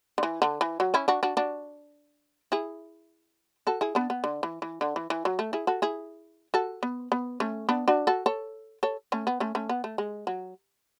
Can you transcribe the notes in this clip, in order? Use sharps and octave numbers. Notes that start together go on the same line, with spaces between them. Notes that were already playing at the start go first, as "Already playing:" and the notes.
D3
E3
D3
E3
F#3
C#4 E4
D4 F#4
D4 F#4
D4 F#4
E4 G#4
F#4 A4
E4 G#4
B3 D4
B3
D3
E3
E3
D3
E3
E3
F#3
A3
E4 G#4
F#4 A4
E4 G#4
F#4 A4
B3
B3
A3 C#4
B3 D4
D4 F#4
F#4 A4
A4 C#5
A4 C#5
A3 C#4
B3
A3 C#4
A3 C#4
B3
A3
G#3
F#3